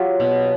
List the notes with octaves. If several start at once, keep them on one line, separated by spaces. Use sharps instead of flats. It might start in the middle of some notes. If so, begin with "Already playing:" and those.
Already playing: F#3 F4 G4
B2